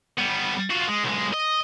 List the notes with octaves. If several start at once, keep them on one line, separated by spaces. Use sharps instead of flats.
G3 B3
F4 F#4
G#3
B1 G#3
D#5